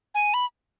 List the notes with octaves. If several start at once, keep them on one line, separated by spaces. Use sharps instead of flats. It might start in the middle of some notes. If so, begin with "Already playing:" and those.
G#5
B5